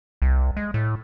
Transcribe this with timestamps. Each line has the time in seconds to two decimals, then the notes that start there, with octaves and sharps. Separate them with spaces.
0.22 C2
0.57 G#3
0.74 A2